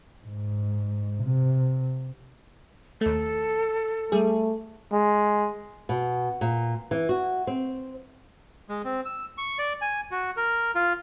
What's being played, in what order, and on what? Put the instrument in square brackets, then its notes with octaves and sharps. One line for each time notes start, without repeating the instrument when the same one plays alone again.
[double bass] G#2
C3
[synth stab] D#2 A3 [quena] A4
[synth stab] G3 G#4 [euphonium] A3
[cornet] G#3
[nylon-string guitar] B2
A#2
E3
F#4
C4
[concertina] G#3
C4
E6
C#6
D5
G#5
F#4
A#4
F4